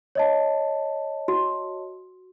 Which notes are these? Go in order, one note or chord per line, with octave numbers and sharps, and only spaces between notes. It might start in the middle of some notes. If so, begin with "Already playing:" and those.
C#5 D#5 A5
F#4